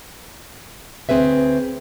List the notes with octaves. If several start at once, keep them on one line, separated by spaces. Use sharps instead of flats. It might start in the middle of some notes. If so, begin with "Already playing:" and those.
D2 E3 C4 G#4 B4 E5